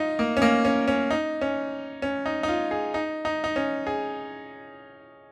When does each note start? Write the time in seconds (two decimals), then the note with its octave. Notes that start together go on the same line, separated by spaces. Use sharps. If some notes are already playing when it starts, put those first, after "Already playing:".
Already playing: D#4 F4
0.19 A#3
0.37 C#4
0.42 A#3
0.65 C#4
0.88 C#4
1.11 D#4
1.41 C#4
2.02 C#4
2.26 D#4
2.43 D#4
2.48 F4
2.71 G#4
2.94 D#4
3.25 D#4
3.44 D#4
3.56 C#4
3.87 G#4